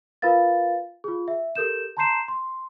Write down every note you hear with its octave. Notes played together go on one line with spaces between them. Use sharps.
F4 A#4 B4 F5 A6
F4 G#4
E5
G4 A4 A#4 G6 E7
A5 A#5 C6 G6 C7 E7
C6